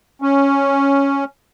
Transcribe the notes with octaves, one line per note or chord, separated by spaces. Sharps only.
C#4